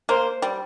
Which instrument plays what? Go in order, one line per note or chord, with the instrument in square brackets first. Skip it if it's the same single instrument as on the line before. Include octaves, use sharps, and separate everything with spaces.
[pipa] A#3 [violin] C5
[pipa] G3